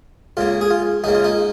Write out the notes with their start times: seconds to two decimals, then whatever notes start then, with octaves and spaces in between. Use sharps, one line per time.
0.37 C#2 C#3 A#3 F4
0.61 G#4
0.70 F4
1.04 C#2 C#3 A#3 D#4
1.15 F4
1.24 D#4